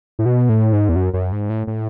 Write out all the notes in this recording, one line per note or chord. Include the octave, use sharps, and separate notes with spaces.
A2
B2
A2
G#2
E2
F#2
F#2
G#2
A2
A2